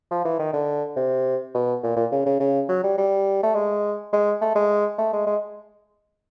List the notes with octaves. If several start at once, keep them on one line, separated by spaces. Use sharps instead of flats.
F3
E3
D#3
D3
C3
B2
A#2
A#2
C#3
C#3
C#3
F#3
G3
G3
A3
G#3
G#3
A3
G#3
A3
G#3
G#3